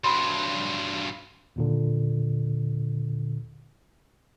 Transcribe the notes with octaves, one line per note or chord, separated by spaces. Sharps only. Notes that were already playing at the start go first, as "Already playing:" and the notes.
G2 F#3 B5 C6
D#2 A#2 D3